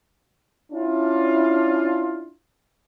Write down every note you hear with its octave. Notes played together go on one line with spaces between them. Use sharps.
C#4 D4 E4 F4